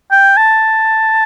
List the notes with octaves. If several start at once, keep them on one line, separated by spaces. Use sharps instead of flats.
G5
A5